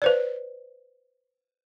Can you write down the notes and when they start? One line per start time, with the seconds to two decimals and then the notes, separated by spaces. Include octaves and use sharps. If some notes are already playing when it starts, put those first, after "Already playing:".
0.02 B4 C5 D5